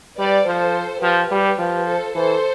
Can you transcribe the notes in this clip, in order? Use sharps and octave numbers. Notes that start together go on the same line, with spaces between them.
G3 B4 D5
F3 A4 C5
F3 G4 B4
G3
F3
A4 C5
E3 A4 C5